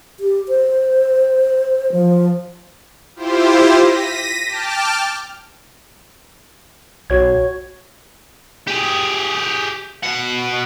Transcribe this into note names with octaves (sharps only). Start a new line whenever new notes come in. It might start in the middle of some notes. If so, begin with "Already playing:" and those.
G4
C5
F3
E4 F4 G4 C5
A#6 B6 D#7
G5 A5 D6 F6
B1 F#4 C#5 G#6
G4 G#4
B2 F#5